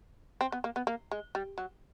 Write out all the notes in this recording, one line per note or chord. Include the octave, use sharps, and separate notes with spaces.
C4
B3
A#3
B3
A#3
G#3
G3
F#3